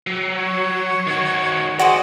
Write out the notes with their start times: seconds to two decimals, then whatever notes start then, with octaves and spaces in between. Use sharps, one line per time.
0.07 F#3
0.37 C#5
1.07 D#3 F#4
1.79 F#4 G#4 C5 D5 D#5